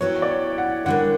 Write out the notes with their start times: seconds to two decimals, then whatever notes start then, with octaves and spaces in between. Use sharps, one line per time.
0.01 F#3 B3 E4 G4 C#5
0.22 D5
0.29 C#5
0.58 F#5
0.86 D3 G3 A#3 F#5